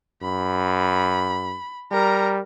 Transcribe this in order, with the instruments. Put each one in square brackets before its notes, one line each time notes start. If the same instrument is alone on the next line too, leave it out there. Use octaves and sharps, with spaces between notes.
[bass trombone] F#2 [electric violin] B5
[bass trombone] G3 [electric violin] A#4 A#5